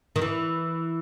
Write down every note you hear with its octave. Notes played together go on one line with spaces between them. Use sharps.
D#3
E3